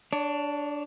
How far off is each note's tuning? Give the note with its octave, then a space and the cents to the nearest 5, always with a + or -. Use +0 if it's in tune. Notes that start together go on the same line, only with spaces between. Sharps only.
D4 +0 C#5 +35